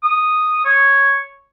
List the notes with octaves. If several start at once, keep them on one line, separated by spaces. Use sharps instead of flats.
D#6
C#5